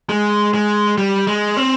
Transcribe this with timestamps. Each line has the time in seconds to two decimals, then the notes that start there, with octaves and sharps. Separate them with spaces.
0.09 G#3
0.54 G#3
0.98 G3
1.27 G#3
1.57 C4